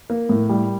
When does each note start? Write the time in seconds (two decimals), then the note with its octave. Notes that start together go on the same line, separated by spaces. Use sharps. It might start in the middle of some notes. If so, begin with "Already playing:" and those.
0.10 A#3
0.29 A2
0.49 G3